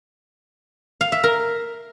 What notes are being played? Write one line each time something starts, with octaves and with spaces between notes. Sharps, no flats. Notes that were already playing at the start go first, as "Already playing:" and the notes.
F5
E5
A#4